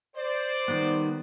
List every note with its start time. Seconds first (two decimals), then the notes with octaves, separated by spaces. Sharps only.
0.16 C5 D5
0.68 D#3 G3 B3